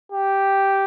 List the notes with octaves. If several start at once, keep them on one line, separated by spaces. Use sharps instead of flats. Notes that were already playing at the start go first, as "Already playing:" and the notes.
G4